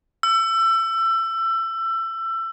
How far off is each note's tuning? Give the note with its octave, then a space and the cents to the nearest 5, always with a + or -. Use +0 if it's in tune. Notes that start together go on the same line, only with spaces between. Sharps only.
E6 +25